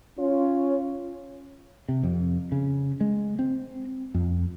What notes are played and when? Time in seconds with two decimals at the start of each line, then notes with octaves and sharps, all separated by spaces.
0.18 C#4 F4 C#5
1.88 C3
2.03 F2
2.52 C#3
3.01 G#3
3.39 C4
4.14 F2